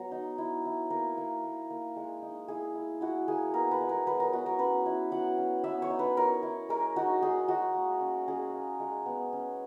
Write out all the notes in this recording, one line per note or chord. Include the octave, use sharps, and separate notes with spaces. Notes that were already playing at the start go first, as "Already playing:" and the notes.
Already playing: F#3 B3 A#5
D#4
E4
E4
A#3 A#4
A#3
A#3
A#3
G#3
D#4
E4 G#4
E4
E4 F#4
A#3 G#4
B3 A#4
B4
G#3
A#4
F#3 B4
A#4
B3 F#4
A#4
C#4 B4
E4
F#3 F#5
C#4
B3 E5
C#5
D#4
B4
E4 A#4
E4
G#3 A#4
D#4 F#4
D#4 G#4
G#3 F#4
A#3
C#4
C#4 G#4
A#3
G#3
B3
C#4